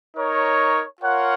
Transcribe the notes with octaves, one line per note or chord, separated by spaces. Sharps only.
D#4 A#4 C#5
F4 A#4 C#5 F#5